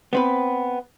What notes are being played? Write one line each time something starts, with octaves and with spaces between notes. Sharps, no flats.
B3 C4 B4